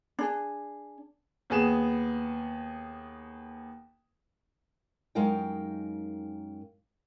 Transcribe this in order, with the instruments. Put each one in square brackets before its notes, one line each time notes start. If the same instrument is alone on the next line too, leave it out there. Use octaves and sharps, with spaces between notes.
[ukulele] D4 G#4
[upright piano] D#2 B3 G#4 E7
[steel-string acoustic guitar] F#2 G#3 D#4 A#4 F5 G5